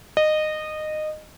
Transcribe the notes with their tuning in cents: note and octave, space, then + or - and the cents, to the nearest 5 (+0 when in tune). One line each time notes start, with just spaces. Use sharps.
D#5 -20